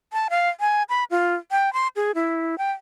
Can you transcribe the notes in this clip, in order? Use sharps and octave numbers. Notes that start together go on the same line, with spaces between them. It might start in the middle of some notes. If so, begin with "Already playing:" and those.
A5
F5
G#5
B5
F4
G5
C6
G#4
E4
G5